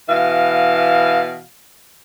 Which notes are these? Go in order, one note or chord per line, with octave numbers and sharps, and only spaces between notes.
B2 E3 F5